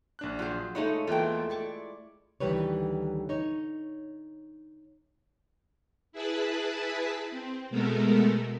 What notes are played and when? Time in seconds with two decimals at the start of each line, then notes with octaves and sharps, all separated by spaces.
0.19 A#1 D4 F#6
0.39 F#3 F4 G#4 C5
0.75 A#2 G#3 A3 D#4 C#5 B5
1.07 E2 E3 A3 A#3 F4 G5
1.50 E4 D5 C#6 D6
2.40 D2 D#3 E3 G3 B4 C#5
3.29 D#4 C#5
6.12 E4 G#4 B4 A5 B5
7.31 C4
7.70 B2 G#3 A3 B3 A4 A#4